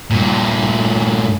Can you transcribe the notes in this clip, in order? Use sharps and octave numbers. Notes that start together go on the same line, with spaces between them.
G2 A#2